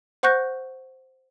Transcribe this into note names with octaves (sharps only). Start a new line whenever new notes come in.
C5 F#5 C#6 F#6 G6 A#6